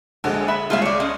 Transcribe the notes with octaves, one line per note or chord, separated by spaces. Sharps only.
A#1 D3 G#3 G#5
E5 B5
C#2 F4 G#4 E5 D#7
C#5 D5
G#3 C#4